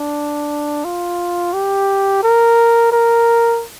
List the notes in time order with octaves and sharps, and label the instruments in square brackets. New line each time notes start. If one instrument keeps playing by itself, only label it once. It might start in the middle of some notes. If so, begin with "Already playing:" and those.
Already playing: [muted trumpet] D4
F4
G4
A#4
A#4